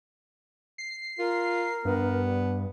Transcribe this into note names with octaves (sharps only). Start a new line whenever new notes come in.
C7
F4 A#4
G2 B3